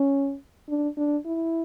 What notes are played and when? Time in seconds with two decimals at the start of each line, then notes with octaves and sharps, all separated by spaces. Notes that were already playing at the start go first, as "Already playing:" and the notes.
Already playing: C#4
0.69 D4
0.97 D4
1.25 E4